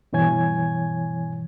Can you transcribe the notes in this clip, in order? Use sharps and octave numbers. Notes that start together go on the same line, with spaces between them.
G2 B2 E3 C#5 G#5 G#6